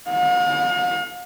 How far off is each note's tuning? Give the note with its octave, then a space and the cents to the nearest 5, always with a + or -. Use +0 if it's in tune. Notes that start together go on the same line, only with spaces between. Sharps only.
F5 +45